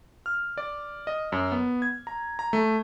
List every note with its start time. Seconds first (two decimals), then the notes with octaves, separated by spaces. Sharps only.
0.26 F6
0.58 D5
1.07 D#5
1.32 F#2
1.52 B3
1.82 G#6
2.07 A#5
2.39 A#5
2.53 A3